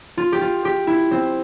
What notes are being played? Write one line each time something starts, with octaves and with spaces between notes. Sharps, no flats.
F4
G4
F4
G4
E4
C4